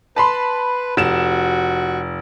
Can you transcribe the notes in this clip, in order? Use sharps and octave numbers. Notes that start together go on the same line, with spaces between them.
B4 A5 B5 C6
F1 F#4 E7